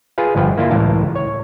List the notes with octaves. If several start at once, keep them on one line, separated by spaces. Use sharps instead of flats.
F4 G#4 B4 F5
G1 F3 B4 G5
A#3 E4 F4
C#2 A2 E3 A#4 F5 A5
C#5